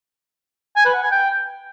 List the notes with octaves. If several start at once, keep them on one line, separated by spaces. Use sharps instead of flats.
G#5
B4
F#5
G#5
G5